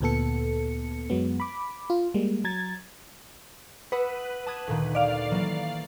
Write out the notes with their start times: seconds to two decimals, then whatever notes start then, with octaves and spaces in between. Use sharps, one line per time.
0.01 D2 A#2 B3 A4 C#7
1.10 F#2 F#3 G#3 B3
1.40 B5 D6
1.90 F4
2.14 G3 G#3 A#3
2.44 F#3 A#5 G#6 A6
3.92 B4 F#5 D#6 E6
4.47 A5 D#6 G#6
4.67 D2 A#2 D#3
4.95 D5 F5
5.31 E3 F#3 A#3